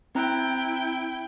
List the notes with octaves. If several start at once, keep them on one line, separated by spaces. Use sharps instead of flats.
C4 E4 G5 A#5 F#6